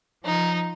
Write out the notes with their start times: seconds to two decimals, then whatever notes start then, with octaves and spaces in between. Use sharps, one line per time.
0.25 F3 D#4